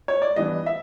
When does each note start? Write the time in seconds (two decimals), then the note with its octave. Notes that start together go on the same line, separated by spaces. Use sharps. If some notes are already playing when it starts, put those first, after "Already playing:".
0.08 C#5
0.22 D5
0.36 E3 G3 B3 D4 D#5
0.66 E5